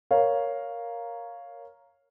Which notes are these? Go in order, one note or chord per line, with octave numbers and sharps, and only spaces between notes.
A#4 C#5 F5